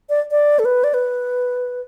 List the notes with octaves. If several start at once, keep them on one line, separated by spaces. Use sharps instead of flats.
D5
D5
A4
B4
D5
B4